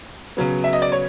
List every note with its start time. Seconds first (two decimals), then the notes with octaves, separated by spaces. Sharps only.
0.37 C#3 F#3 B3
0.64 E5
0.73 D#5
0.82 D5
0.92 C#5